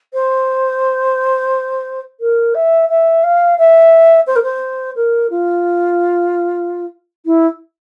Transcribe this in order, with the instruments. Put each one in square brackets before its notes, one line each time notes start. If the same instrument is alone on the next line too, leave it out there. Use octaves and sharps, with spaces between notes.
[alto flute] C5
A#4
E5
E5
F5
E5
C5
A#4
C5
A#4
F4
E4